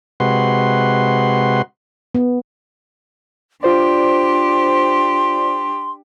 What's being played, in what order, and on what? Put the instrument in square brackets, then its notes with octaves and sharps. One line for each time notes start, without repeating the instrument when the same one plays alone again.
[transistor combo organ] C3 G#3 F#4 B4 C6
[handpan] B3
[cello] D4 G4 [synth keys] F4 C5 D5 [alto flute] C6